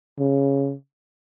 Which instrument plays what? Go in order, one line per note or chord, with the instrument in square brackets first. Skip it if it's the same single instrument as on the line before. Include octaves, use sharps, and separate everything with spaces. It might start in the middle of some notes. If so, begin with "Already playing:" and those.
[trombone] C#3